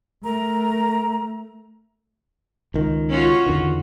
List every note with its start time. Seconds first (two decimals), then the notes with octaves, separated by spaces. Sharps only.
0.23 A3 A#4 A#5
2.74 C#2 D#3
3.10 C#4 F4 F#4
3.46 E2 D3 D#3